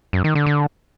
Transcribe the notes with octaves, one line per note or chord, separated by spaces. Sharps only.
F#2
D#3
D3
D3